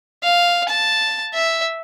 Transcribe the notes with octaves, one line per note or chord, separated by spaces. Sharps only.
F5
A5
E5